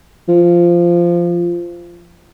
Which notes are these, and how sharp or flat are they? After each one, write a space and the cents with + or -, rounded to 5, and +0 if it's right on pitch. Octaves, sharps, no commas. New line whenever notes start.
F3 -15